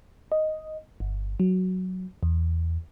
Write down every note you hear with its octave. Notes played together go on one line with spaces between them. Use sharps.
D#5
G1
F#3
E2